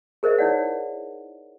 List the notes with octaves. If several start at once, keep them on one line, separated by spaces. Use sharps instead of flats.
G#4 A#4 C5 D#5 E5
D#4 E4 C#5 D5 F#5